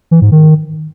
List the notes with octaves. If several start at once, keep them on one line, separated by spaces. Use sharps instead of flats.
E3
G#2
D#3